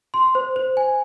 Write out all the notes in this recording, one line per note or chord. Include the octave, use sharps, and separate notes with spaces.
C6
C5
C5
G#5